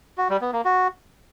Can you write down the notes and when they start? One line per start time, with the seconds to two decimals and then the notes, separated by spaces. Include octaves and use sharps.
0.18 F#4
0.29 G3
0.41 B3
0.53 A#3
0.65 F#4